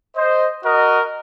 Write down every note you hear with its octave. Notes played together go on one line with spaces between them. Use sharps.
C5 D#5
F#4 A#4 D#5